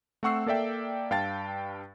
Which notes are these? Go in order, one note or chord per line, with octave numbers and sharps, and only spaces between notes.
A3 C4 F#5 C#6 E6 C7
A#3 A4 D5 E5 G5
G2 F5 G5 A5 A6